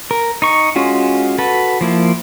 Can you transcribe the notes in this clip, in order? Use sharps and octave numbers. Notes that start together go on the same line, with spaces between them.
A#4
D#4 C#6
G#3 C#4 F4 F#4
F#4 A4 B4
F3 A#3 E4